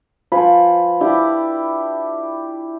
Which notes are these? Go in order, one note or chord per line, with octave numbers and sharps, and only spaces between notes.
F3 B4 G#5 B5
D4 E4 G4